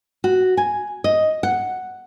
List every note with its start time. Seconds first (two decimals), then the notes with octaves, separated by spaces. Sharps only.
0.24 F#4
0.57 G#5
1.04 D#5
1.43 F#5